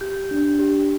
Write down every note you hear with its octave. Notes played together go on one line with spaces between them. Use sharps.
G4 G6
D4
G4